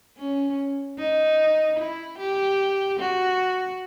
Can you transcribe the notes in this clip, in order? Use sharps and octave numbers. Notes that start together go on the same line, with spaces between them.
C#4
D#4
E4
G4
F#4